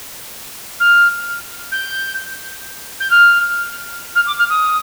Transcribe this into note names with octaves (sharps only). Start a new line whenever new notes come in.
F6
G6
G6
F6
F6
D6
F6
D#6